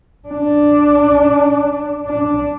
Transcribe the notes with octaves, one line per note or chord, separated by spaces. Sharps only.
D4
D4